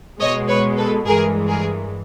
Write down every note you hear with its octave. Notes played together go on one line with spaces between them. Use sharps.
B2 G#3 C#5 D#5
B4 C#5
A4 B4
G2 E3 G#3 G#4 A#4
G#4 A#4